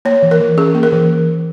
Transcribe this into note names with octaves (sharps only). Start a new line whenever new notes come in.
A#3 C#5
E3
A#4
E3
C#4 G#4
A#3
A#4
E3